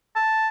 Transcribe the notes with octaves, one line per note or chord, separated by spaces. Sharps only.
A5